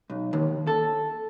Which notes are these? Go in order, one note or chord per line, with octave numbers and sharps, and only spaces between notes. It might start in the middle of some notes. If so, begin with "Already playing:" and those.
B1
D#2
A4